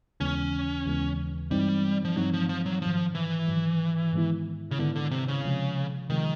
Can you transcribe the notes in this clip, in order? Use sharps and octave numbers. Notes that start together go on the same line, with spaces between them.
D#2 C#3 E3 G#3 B3 C#4
D#2 C#3 E3 G#3 B3
G2 E3 G3 G#3 C4 D#4
F3
G2 E3 F#3 G#3 C4 D#4
F3
F3
F#3
G#2 D#3 F3 F#3
E3
G#2 D#3 F#3
G#2 D#3 G#3 B3 E4
C#3
G#2 D3 D#3 G#3 B3 E4
D3
C3
C#3
C3 F3 G#3
C3 D#3 F3 G#3